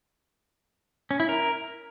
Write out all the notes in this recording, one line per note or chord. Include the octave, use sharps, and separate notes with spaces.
C#4
E4
A#4